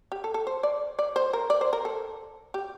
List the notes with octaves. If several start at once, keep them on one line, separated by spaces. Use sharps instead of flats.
G4
A4
A4
C5
D5
D5
C5
A#4
D5
C5
A#4
A4
G4